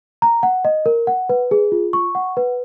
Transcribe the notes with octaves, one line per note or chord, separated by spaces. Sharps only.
A#5
F#5
D#5
A#4
F#5
B4
G#4
F4
C#6
F#5
B4